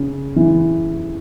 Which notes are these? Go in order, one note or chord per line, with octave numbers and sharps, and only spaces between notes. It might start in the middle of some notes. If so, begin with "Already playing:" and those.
Already playing: C#3
E3